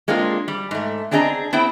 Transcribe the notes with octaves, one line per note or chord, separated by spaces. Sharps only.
G#3 A#3 C4 D4 F4
G3
G#2 A3
B3 C4 D4 G#4 D#5 A#5
B3 C4 E4 G5